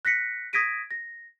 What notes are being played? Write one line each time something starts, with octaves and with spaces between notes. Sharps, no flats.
F#6 A#6 B6 C#7
D#6 G#6 A#6 B6 D7 D#7
A#6